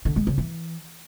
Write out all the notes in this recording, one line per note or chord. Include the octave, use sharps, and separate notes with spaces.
D3
G#3
C#3
E3